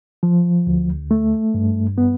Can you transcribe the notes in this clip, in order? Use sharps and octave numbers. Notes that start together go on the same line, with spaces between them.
F3
D2
A3
G2
B3